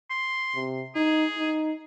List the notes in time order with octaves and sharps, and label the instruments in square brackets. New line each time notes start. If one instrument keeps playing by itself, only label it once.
[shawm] C6
[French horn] C3
[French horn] D#4 [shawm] G#4
[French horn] D#4